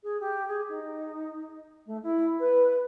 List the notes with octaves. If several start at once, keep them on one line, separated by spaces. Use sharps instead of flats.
G#4
G4
G#4
D#4
A3
E4
B4